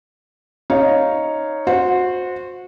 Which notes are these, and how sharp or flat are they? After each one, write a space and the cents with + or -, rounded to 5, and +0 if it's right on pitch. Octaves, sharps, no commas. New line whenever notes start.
D#4 +0 C#5 +0 F5 +0
F#4 -25 C5 +0